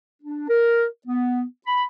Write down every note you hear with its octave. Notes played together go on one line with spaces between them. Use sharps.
D4
A#4
B3
B5